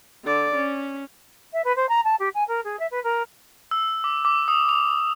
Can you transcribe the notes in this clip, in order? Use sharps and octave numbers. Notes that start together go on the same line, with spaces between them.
D3 D5
C#4
E5
B4
C5
A#5
A5
G4
G#5
A#4
G#4
E5
B4
A#4
E6
D6
D6
D#6
F7